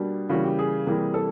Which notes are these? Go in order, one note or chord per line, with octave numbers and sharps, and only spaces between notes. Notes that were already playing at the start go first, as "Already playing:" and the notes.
Already playing: B2 G3 A#3 D4
C#3 E3 G3 A#3 F#4
G4
G#4
C3 E3 G3 A#3
A4